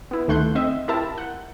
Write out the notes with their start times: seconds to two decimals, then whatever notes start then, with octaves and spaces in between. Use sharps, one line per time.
0.11 B3 E4
0.28 D2 D#3 A3 F#5 C6 G6
0.55 C4 D#5 E5
0.88 E4 F4 G4 A#4 E5 A5
1.18 F#5